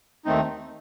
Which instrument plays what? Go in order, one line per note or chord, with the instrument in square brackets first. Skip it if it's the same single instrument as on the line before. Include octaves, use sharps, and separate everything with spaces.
[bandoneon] D#2 D#3 A3 C4 D#4